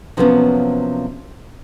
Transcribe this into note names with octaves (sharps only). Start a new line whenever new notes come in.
C3 F3 F#3 A#3 B3 C#4